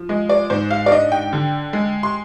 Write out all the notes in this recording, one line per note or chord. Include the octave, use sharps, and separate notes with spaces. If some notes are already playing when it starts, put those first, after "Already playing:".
Already playing: F3
G#3 D#5
D5
G#2 C5
F5
D5
D4 D#5
G5
D3
G#3
C6